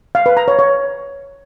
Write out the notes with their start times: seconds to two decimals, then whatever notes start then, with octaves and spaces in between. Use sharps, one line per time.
0.15 F5
0.26 B4
0.37 A#5
0.48 C#5
0.59 C#5